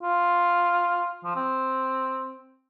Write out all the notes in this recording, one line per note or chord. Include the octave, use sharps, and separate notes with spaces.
F4
F3
C4